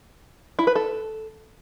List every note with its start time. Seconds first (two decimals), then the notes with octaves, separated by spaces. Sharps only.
0.59 E4
0.67 B4
0.75 A4